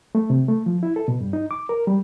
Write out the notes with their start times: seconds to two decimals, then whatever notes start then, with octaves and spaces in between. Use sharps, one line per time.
0.15 A3
0.30 C3
0.48 A3
0.66 F3
0.83 E4
0.96 A4
1.08 B2
1.21 G2
1.33 D#4
1.51 D6
1.69 A#4
1.87 G3